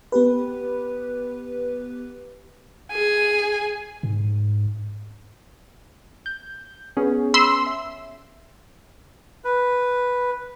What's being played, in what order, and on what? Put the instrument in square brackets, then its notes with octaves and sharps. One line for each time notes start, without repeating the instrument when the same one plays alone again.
[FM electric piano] B3 G4 B4
[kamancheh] G#4 G#5
[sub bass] G#2
[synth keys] G6
B3 C#4 G#4
[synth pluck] B5 C6 E6
[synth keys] E5
[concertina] B4